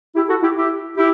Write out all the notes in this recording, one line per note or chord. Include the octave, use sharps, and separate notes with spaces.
E4 G4
F#4 A4
E4 G4
E4 G4
E4 G4